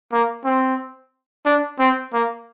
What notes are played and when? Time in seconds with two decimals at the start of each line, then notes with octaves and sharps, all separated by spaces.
0.12 A#3
0.45 C4
1.45 D4
1.79 C4
2.13 A#3